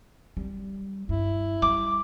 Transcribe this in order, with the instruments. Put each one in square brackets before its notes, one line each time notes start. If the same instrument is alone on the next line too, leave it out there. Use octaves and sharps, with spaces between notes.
[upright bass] G3
[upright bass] G2 [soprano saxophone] E4
[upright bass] G3 [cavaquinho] D6